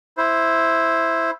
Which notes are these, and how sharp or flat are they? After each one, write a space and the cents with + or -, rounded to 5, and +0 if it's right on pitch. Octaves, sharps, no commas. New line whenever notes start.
E4 +0 C5 +0